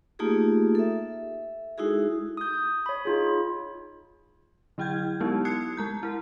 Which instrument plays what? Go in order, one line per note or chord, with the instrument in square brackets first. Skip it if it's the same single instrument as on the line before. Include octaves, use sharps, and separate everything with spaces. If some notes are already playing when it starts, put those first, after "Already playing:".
[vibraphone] A3 A#3 D#4 F4 G4 G#4
A4 E5
G#3 D#4 E4 F#4 G#4
[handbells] D#6 G6
C#5 B5
D#4 F4 G#4
[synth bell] D3 F#3 E4 G5 G6 G#6
G#3 B3 D#4 E4 G4
D#6 F#6 G#6 C7 C#7
G#3 A#5 G6
E4 A#4